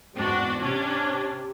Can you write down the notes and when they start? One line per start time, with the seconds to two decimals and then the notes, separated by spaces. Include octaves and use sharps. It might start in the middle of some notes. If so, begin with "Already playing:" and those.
0.15 E2 G#2 C4 D4 F#4
0.59 C3 C#4 D4